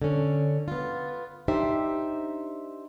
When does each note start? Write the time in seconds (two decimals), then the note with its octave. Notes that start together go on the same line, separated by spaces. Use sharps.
0.02 D3 C#4
0.68 B3 F4
1.48 D4 D#4 G4 C5 E5